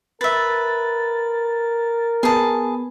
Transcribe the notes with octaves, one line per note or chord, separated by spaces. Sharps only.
A#4 B4 E5 A6
B3 G#4 A5